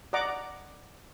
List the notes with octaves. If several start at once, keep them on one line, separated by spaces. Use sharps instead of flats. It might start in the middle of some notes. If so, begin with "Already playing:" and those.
D5 D#5 F#5 A#5 D6